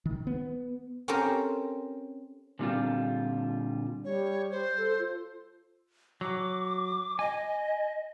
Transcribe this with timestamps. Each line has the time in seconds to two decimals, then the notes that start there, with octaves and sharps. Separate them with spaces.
0.06 D#3
0.27 B3
1.08 C4 C#4 G4 A4 A#4 C5
2.59 A#2 D3 G3 C4 D4 F4
4.04 G3 C#5
4.51 C5
4.78 A4
4.99 F4
6.21 F#3 D6
7.19 D#5 G#5